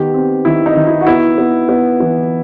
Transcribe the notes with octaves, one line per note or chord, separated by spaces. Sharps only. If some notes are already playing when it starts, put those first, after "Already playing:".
Already playing: D#3 B3 G4
C4
D#3 E4
D#4
D#3
E4
F#4
B3 E4
B3
B3
E3